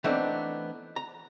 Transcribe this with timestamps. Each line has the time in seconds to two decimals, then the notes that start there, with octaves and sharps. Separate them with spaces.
0.04 E3 A3 B3 C4 D4 D#4
0.96 A#5